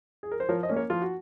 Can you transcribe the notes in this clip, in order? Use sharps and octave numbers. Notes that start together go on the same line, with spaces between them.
G#4
A#4
C5
F3 A#4 C#5
C5 D#5
A#3 C#4
A#4 C#5
F3 F4
F#4